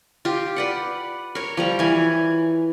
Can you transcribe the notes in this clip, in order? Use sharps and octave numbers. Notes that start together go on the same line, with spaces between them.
F4 G4
B4 D5 F#5
A#4 C#5
F3 G3 A#5
E3 G#5